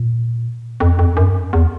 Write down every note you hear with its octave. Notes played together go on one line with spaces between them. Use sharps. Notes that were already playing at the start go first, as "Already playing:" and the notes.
Already playing: A#2
F2
F2
F#2
E2